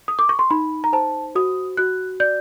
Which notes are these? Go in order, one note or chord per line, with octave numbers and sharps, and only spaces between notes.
D#6
D6
C#6
C6
D#4 B5
A#5
C5 A5
F#4 D#6
F#4 F#6
D5 G6